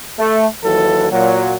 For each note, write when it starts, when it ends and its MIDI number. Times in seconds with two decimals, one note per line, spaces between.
0.19 0.46 57
0.63 1.07 39
0.63 1.07 52
0.63 1.07 54
0.63 1.07 69
1.11 1.55 46
1.11 1.55 54